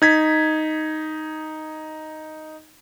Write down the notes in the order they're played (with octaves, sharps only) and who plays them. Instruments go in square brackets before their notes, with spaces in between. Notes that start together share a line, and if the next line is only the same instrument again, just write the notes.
[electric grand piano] D#4 G#6 B6